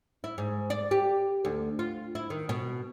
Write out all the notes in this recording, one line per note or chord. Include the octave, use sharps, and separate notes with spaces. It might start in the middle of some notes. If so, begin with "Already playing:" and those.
E4
G#2
D5
G4
D2
F4
E4
D#3
B2